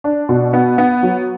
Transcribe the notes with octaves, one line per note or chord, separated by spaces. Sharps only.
D4
B2
B3
B3
F#3